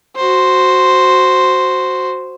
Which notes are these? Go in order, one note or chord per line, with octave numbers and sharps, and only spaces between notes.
F#4 C5